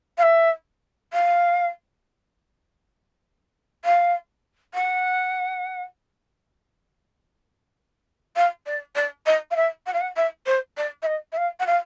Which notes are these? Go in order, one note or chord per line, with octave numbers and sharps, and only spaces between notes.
F5
E5
F5
F5
F#5
F5
D5
D5
D#5
F5
E5
F#5
F5
F#5
E5
C5
D5
E5
D#5
E5
F5
F#5
F5